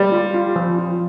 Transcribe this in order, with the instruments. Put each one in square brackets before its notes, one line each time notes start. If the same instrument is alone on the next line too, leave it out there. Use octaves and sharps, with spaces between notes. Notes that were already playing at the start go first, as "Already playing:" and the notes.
Already playing: [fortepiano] G3
[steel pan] F4
F4
F3
F4